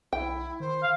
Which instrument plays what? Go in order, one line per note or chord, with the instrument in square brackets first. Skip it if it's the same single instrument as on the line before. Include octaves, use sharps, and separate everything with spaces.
[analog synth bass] B1 [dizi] E4 [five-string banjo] G5
[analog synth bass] D#3 [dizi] C5
[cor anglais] F5